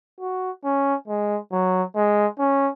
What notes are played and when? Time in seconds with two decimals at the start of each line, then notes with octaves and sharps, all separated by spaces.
0.20 F#4
0.65 C#4
1.08 G#3
1.52 F#3
1.96 G#3
2.39 C#4